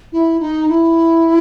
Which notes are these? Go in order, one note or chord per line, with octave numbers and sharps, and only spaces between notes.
E4
D#4
E4